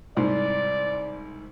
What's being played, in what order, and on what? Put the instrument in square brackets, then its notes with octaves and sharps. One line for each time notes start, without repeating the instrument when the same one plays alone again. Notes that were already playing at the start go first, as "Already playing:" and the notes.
[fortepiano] C2 G#2 [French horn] D5